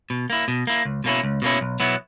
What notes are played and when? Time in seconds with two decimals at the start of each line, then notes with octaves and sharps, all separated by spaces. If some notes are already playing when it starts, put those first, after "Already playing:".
0.10 B2
0.30 A#3 E4
0.48 B2
0.67 A#3 E4
0.85 C#2
1.04 B2 A#3 C#4 E4
1.24 C#2
1.42 B2 A#3 C#4 E4
1.61 B1
1.80 B2 F#3 B3 E4